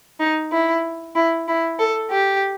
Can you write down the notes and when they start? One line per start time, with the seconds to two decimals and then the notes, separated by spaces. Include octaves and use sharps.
0.20 D#4
0.52 E4
1.16 E4
1.48 E4
1.80 A4
2.11 G4